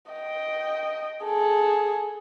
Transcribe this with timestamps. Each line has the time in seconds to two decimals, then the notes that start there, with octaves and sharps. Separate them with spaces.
0.12 D#5 G5
1.25 G#4 A4